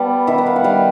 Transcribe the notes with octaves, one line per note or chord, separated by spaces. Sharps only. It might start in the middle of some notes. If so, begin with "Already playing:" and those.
Already playing: G3 B3 A5
D#3 E5
F#5
F5
F#5
G3 F5